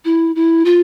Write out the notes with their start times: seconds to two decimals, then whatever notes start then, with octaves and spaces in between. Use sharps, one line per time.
0.05 E4
0.35 E4
0.65 F4